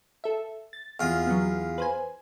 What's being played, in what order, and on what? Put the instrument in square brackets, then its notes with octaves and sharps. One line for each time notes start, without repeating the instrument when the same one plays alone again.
[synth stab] A4 E5
A6
[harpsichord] E2 F4
[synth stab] F#3 B3
B4 C5 G#5